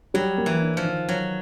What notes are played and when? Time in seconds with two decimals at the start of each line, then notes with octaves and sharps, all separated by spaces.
0.14 F#3 G3
0.38 A#3
0.46 E3
0.62 D4
0.77 F3
0.85 D#3
1.08 D#3 F#3